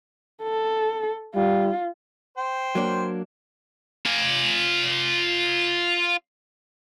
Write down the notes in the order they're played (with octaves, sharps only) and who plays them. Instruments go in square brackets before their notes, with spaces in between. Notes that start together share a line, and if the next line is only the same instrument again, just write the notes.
[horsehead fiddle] A4
[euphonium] G3 [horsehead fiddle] F4
[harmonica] C5 G5
[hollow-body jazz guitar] F#3 A#3 D4
[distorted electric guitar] F4 G#5